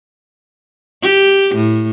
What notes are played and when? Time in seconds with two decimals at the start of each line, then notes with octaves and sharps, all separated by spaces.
1.03 G4
1.56 A2